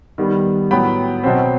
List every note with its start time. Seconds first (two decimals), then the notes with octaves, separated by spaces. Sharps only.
0.18 D#3 G3 B3
0.71 A2 F#3 B3 G5 B5
1.24 B2 F#3 C4